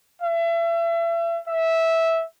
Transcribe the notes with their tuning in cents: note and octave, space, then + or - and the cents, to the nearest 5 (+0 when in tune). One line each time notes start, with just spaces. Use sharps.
E5 +35
E5 -10